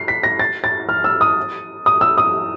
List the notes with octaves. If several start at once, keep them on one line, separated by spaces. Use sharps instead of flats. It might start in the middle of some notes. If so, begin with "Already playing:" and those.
Already playing: C7
B6
A#6
A6
A6
F6
E6
D#6
D#6
E6
D#6